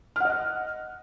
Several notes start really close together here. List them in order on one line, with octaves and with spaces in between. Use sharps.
F6 F#5 D#5 F#6